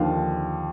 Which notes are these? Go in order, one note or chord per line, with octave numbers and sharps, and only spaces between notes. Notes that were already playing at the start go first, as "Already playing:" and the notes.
Already playing: D#2 D3 F3 F5